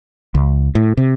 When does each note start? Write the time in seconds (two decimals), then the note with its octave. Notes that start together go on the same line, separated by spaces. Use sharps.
0.35 C#2
0.75 A2
0.97 C3